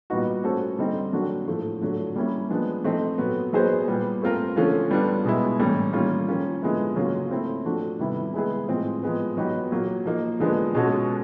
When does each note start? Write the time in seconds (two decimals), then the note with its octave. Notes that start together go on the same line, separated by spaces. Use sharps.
0.10 A#2 G3 B3 D#4 F#4
0.43 A3 C#4 F#4 A4 C5
0.78 D3 G3 C4 D#4
1.13 D3 F#3 A#3 D4 F#4
1.47 A2 F3 A3
1.81 D3 F#3 A3 D4
2.16 G3 A#3 C#4 E4
2.50 F3 G#3 B3 D4
2.84 F3 A3 C4 D#4
3.18 A#2 F#3 B3
3.53 F#3 B3 D#4 G#4 C5
3.87 A#2 G3 B3
4.22 A3 C4 F4 A#4
4.56 D3 F3 A3 C#4 F4
4.91 G3 B3 D4 F4
5.24 B2 G#3 B3 E4
5.59 A2 E3 G3 A#3 C#4
5.93 D#3 G3 A#3 C#4 F4
6.28 F3 A#3 C#4 F4
6.62 D3 F3 G#3 B3 E4
6.96 C#3 F#3 A#3 C#4 F4
7.31 A3 C4 E4
7.65 F3 A3 D4 F#4
7.99 C3 D#3 G3 B3 E4
8.34 G#3 B3 E4 G#4
8.68 A2 F3 G#3 C4 F4
9.03 F3 G#3 B3
9.37 F#3 B3 D#4 G4 B4
9.71 A#2 F#3 A#3
10.06 F3 A#3 D#4
10.40 D3 F3 G#3 B3 D4
10.74 B2 G#3 C#4 F#4 A4